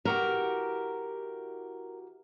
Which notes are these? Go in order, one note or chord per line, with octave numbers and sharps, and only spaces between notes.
E3 F#4 G4 A#4